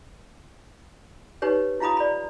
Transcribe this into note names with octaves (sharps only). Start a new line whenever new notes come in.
D#4 G4 B4 C#5
E4 F4 F5 A#5 B5 D#6
D5 B5